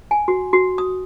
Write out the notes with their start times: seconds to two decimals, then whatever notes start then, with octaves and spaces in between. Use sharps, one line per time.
0.11 G#5
0.28 F#4
0.53 F#4
0.78 D#6